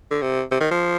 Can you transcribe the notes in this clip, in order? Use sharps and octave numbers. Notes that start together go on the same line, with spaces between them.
D3
C3
C3
D#3
F3